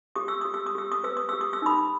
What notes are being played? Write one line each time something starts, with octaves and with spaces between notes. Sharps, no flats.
G4 D#6
E6
G4 D#6
E6
D#6
G4 E6
D#6
B4 E6
D#6
G4 E6
D#6
E6
D#4 B5 D#6